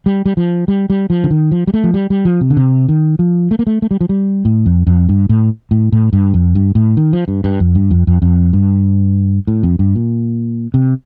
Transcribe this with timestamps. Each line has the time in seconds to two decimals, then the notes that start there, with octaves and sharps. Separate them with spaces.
0.06 G3
0.26 G3
0.37 F3
0.68 G3
0.90 G3
1.10 F3
1.24 D3
1.31 D#3
1.51 F3
1.67 G3
1.74 A3
1.84 F3
1.94 G3
2.10 G3
2.25 F3
2.41 C3
2.50 D3
2.57 C3
2.89 D#3
3.19 F3
3.51 A3
3.59 A#3
3.67 A3
3.82 A3
3.91 G3
4.01 F3
4.09 G3
4.45 A2
4.66 F2
4.87 F2
5.09 G2
5.29 A2
5.71 A2
5.92 A2
6.13 G2
6.34 F2
6.55 G2
6.75 A2
6.97 D#3
7.13 F3
7.28 G2
7.44 G2
7.60 F2
7.75 G2
7.91 F2
8.07 F2
8.22 F2
8.53 G2
9.47 A2
9.63 F2
9.79 G2
9.95 A#2
10.74 C3